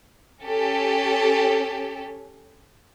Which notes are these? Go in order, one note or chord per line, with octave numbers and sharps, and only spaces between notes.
C#4 G4 A4